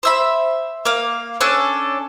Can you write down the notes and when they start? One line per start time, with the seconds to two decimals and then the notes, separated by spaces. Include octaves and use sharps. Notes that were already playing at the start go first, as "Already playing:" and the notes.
0.03 C5 E5 B5
0.85 A#3 F5
1.41 C#4 D4 A4 F#6